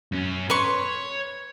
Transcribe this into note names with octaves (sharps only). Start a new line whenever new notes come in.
F#2 C#4
B4 C#5 C6 C#6